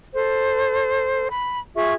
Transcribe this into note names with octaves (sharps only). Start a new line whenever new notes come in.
A4 C5
B5
F4 G#4 E5 C#6